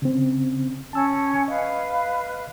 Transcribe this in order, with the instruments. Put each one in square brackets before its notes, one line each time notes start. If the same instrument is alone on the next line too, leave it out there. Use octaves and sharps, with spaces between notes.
[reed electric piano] C#3 C4
[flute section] C#4 [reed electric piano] A5 E6
[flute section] B4 F5 [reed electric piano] D#5